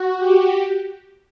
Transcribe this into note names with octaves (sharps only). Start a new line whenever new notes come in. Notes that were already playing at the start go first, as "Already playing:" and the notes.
Already playing: F#4
G4
G4